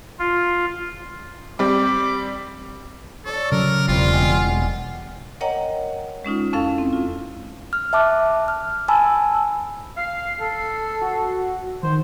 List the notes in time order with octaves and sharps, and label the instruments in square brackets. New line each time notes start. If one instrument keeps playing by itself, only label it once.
[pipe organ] F4
[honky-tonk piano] G3 C4 [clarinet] D6
[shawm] A4 [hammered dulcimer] C#5 D5
[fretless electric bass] C#3 F#3 [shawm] A#4
[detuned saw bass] E1 [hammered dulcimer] G3 C4 [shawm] F4
[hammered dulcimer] G3 G#3 F#5
[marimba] A#4 C#5 D#5 F#5 G5 A#5
G#3 C#4 D#4 F4
F2 C#4 E4 A4 F5 G5
C4
F4
[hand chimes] F6
E5 A5 D6 F#6
F6
G#5 A5 B5 E6
[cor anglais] F5 [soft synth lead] C7
[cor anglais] A4
[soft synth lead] F#4
[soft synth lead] D#3 [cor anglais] C5